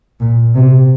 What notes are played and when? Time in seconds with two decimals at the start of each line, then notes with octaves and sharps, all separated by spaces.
0.20 A#2
0.54 C3